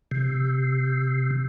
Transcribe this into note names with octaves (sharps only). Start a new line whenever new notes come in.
C3